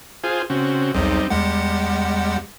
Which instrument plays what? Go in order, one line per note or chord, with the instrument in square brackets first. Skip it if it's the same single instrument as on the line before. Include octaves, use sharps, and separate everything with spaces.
[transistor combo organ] F4 G#4 C5
C#3 C4 F#4
[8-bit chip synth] B1 E2 [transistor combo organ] G3 C4 D#4
[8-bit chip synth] E2 G#3 F#5 [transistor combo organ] G3